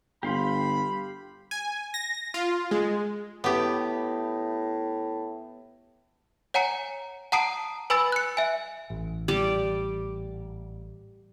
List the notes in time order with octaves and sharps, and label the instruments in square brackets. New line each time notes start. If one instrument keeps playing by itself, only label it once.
[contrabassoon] G1 [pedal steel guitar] G4 F5 C6 [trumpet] B5
[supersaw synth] G#5
A#6
F4
G#3
[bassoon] A2 [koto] B3 G4
[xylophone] C#5 F#5 G#5 A#5 C#7
F#5 A5 A#5 D#6 C7 D7
B4 G#5 B5 E6 A6
F#6 C#7
E5 G#5
[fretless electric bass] A1
[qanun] G3 D5